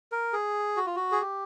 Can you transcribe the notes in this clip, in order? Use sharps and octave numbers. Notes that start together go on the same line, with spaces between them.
A#4
G#4
F#4
F4
F#4
G#4
G4